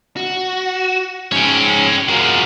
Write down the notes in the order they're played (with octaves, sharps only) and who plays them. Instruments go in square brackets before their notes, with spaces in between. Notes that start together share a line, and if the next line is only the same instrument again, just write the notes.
[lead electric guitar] F#4
[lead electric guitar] G#2 C#4 [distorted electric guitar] C#5 G5
[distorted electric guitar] F3 G#3 [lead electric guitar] F#4 A#4